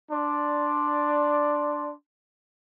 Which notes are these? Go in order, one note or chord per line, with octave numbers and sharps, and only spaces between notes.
D4 D5 C6